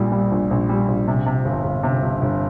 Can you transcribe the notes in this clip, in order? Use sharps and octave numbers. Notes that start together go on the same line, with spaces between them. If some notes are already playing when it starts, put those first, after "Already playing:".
Already playing: A#1 A#2 G3
G3
A#1
A#1
G3
A#1
C3
C3
G1
G1
C3
G1
G1